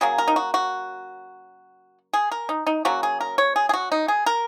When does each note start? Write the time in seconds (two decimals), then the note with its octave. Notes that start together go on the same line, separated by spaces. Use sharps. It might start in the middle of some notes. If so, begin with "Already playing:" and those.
0.01 C#3 F#3 A#3 G#4
0.18 A#4
0.28 D#4
0.36 F#4
0.54 F#4
2.13 G#4
2.32 A#4
2.49 D#4
2.67 D#4
2.85 C#3 F#3 A#3 F#4
3.03 G#4
3.21 A#4
3.38 C#5
3.56 G#4
3.69 G#4
3.73 F#4
3.92 D#4
4.08 G#4
4.26 A#4